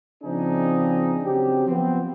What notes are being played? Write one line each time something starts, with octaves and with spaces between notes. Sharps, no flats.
C#3 F3 C4 D4 D#4 G#4
C#3 F#3 C4 G4
F3 B3 C4